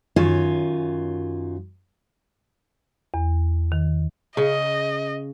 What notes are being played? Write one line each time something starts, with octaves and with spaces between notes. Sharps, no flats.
F#2 D#3 F4 C#5 G#5
E2
D#3
C#3 D#5